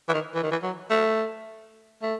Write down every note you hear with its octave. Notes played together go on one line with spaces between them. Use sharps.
E3
D#3
E3
D#3
E3
F#3
A3
A3